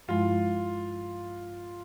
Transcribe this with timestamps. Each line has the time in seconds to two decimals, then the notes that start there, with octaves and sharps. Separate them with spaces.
0.08 G2 F3 G#3 E4 F4